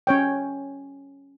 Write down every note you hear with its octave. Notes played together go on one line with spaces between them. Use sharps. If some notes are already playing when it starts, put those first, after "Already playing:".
C#4 C#5 G5